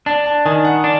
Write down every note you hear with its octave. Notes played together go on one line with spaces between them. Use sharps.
D4 A5
A5
D#3 G#5
F#5
D4